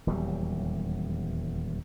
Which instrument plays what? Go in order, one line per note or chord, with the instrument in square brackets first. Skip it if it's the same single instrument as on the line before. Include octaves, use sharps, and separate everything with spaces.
[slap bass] D#1 E2 F#3 G3